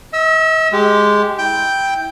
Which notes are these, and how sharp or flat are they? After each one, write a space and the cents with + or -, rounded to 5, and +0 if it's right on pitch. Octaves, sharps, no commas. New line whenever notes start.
D#5 +45 E6 +0
G#3 +0 G4 -5
E4 -20 G5 +0